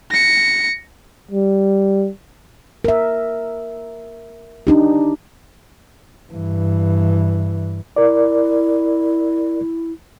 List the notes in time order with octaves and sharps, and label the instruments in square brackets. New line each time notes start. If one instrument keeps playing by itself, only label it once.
[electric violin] A#6 C#7
[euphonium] G3
[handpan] A#4 E5
D4 D#4 G4
[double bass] G2 E3
[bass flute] E4 [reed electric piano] A#4 D5